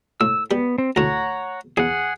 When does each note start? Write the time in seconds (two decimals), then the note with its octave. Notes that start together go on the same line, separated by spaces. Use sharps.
0.21 A2 E6
0.51 G3 B3
0.78 C4
0.96 D2 A2 C#5 F#5 A#5
1.77 E2 G#4 F#5